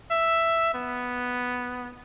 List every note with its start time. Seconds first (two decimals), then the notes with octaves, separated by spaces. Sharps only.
0.11 E5
0.74 B3